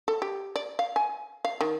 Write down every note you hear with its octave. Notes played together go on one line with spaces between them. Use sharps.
A4
G4
D5
F5
G#5
F5
D#3